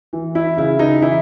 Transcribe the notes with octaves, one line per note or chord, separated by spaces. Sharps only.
E3
E4
C#3 E4
D#4
E3 E4